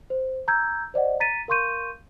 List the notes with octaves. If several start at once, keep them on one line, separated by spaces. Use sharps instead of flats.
C5
A#5 E6 G6 G#6
C5 D5 D#5 F#5
A#5 A6 B6 D#7
A#4 F5 C6 C#6 G6 D#7